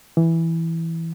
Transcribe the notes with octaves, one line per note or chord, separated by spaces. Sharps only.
E3